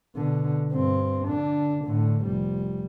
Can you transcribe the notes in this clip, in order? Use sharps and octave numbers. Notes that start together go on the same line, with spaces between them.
B2 D3
G2 C4
D3 D4
A2 D3
F1 G3